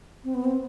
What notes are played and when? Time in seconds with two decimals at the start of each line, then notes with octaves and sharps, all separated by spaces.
0.24 C4
0.34 B3
0.44 C4